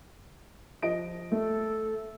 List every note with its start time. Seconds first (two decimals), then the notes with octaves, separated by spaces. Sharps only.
0.82 F3 D#5 D7
1.32 A3 A4